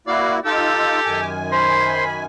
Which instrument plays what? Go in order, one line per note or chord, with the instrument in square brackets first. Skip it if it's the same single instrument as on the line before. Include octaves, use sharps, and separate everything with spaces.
[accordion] A#3 E4 F#4 [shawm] D5 [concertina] F5
[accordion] D#4 F4 E6 [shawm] G4 [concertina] A4
[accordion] F#2 D#3 G#5
[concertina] C5 C6 [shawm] B5